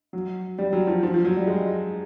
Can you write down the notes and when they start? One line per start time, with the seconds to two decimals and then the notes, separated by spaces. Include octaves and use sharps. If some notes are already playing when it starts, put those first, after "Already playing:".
0.13 F#3
0.59 G3
0.73 F#3
0.87 F3
1.03 F3
1.14 F3
1.25 F#3
1.37 G3
1.47 G#3